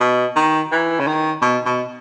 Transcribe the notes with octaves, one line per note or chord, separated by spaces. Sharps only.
B2
D#3
E3
C#3
D#3
B2
B2